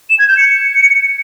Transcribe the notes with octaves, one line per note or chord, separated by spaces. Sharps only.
E7
G#6
G6
C#7